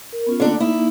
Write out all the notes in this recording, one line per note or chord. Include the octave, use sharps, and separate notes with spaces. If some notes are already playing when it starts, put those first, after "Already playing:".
A#4
B3 C#4 F4
D3 A3 A#3 D4
A#3 D#4 E4